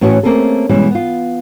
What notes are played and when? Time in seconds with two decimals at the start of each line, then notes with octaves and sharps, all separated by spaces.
0.01 A2 E3 C#4 F#4 B4 C#5
0.23 A3 A#3 C4 C#4 G#4 A4
0.69 B2 E3 G3 G#3 C#4
0.91 B3 F4